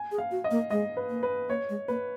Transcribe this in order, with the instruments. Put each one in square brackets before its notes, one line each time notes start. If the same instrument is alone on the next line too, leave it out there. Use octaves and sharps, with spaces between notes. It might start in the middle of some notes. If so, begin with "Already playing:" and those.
Already playing: [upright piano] G#5
[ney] G#4
[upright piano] F5
[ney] F#4
[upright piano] D#5
[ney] A#3
[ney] G#3 [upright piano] D#5
[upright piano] B4
[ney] A#3
[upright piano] B4
[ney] A#3 [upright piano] C#5
[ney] G#3
[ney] A#3 [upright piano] B4